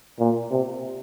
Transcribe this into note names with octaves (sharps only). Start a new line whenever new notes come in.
A#2
C3